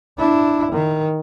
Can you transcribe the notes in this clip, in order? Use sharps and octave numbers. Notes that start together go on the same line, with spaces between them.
D4 E4
D#3